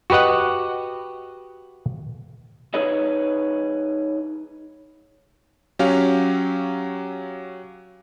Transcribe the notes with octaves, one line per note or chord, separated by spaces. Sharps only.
F#4 G4 B4 D#5 F#5
D#4 G#4 B4 C#5 D#5
F#3 C#4 G4 F5